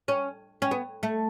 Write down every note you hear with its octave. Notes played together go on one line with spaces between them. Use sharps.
C#4
C#4
B3
A3